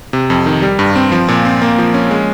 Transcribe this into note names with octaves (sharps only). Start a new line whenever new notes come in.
C3
F2
D#3
G3
G2
C4
F3
A#2
C4
A#3
F3
C#4
G#3